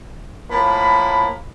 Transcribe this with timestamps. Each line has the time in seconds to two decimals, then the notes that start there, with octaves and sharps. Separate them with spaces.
0.50 A2 F3 A#3 B5